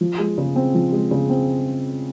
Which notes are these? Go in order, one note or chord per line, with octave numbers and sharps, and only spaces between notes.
F3
G#3
C#3
C4
F3
G#3
C#3
C4